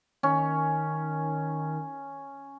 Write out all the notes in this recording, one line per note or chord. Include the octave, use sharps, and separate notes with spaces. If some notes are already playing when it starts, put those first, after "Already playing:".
D#3 C#4